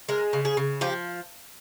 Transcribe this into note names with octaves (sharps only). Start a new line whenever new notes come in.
G#3 A#4
C#3
G#4
C#3
F3 G4